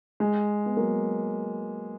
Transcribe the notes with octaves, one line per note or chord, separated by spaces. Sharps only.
G#3
B3
F#3 A#3